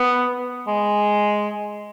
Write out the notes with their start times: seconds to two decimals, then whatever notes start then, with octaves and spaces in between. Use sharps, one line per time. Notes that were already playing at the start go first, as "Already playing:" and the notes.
Already playing: B3
0.67 G#3